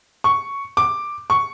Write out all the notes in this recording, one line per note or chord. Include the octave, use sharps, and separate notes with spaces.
C#6
D6
C#6